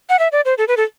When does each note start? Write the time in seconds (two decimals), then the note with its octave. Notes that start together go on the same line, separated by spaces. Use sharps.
0.09 F#5
0.19 E5
0.32 D5
0.45 C5
0.58 A4
0.68 B4
0.77 A4